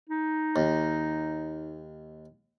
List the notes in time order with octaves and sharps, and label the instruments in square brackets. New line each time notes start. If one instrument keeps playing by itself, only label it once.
[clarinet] D#4
[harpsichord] D#2